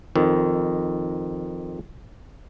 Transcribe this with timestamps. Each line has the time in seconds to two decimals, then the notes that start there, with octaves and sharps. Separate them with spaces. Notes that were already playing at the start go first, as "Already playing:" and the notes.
0.16 F2 D#3